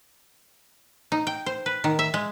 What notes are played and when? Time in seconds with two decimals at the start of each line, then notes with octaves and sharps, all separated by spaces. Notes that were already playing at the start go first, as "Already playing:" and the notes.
1.12 D#4
1.27 G5
1.46 C5
1.66 B4
1.84 D#3
1.99 E5
2.14 G#3